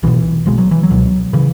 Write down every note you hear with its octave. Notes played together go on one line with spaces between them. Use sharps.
B1 B2 E3
B1 B2 G#3
F#3
E3
F#3
C#2 B2
C#3 E3